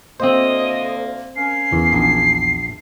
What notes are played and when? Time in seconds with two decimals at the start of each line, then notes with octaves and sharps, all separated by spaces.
0.20 D2 A#3 C4 C5 D#5
1.36 A#3 C#4 C7
1.72 E2
1.93 A#1